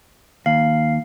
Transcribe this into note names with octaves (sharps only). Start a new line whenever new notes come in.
D#2 F5